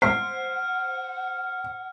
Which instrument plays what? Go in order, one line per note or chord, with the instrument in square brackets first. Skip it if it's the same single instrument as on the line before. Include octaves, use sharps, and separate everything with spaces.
[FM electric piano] C5 [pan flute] F#5 [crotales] F6 [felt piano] C7